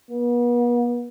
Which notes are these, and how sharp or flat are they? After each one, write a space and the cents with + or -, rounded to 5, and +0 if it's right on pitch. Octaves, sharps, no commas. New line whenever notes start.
B3 -40